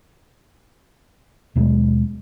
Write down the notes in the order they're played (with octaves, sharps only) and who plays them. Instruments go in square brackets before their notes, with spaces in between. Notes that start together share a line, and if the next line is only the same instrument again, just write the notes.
[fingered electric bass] D#2 B2 F#3 G#3